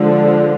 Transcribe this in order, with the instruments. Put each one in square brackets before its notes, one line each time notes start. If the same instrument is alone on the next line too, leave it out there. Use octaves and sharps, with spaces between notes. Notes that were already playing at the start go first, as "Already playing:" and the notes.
Already playing: [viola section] D3 F3 G#3